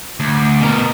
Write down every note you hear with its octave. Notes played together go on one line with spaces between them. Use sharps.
D2
B2 A#4